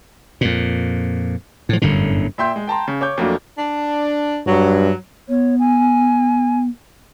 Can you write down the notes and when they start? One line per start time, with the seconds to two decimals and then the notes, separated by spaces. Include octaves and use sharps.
0.41 F2 A#2
1.69 A2 F3
1.82 G1 F#2 A2 D3
2.38 A#2 E5 G5 C6 G6
2.56 G#3
2.67 G5 A5 A#5 C6
2.88 C#3
3.01 C#5 D6 G6
3.18 F2 F#3 A3 A#3 D4
3.58 D4
4.46 G2 F#3
5.29 B3 C#5
5.59 G#5